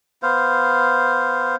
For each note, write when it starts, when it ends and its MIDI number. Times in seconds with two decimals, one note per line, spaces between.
0.23 1.56 59
0.23 1.56 72
0.23 1.56 77